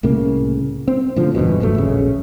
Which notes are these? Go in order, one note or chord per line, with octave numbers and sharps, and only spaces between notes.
C2 A2 C#3 A#3
C4
A2 D3 F3
E1 E2 G2 B2
F1 G2 F#3 A3
D1 A#1 C#3